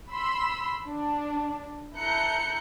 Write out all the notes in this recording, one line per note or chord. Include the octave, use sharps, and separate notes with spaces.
B5 C6 E6
D4
E4 A4 A#5 F#6 G6 C#7